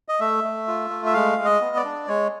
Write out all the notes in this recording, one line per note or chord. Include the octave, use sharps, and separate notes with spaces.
D#5
A3 E5
A3
F4
A3
E5
G#3 F5
G#3
D#5
B3
D5
D4
G#3 C#5